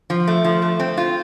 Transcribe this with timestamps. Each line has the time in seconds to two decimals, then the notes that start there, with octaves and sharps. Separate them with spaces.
0.10 F3
0.27 A3
0.44 F3
0.62 A3
0.80 C4
0.97 F4